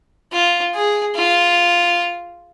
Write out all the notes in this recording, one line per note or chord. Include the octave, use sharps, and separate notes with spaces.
F4
G#4
F4